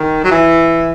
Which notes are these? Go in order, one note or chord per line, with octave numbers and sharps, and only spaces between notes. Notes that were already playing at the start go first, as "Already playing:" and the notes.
Already playing: D#3
F#3
E3